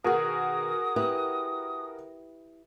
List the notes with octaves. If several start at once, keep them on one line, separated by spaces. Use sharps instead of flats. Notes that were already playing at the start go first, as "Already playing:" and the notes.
B2 D#3 F#4 G#4 A#4 D#6
E4 G4 B4